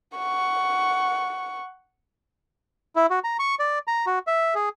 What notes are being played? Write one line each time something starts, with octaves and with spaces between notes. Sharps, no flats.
F#5 C#6
E4
F#4
A#5
C#6
D5
A#5
F#4
E5
G#4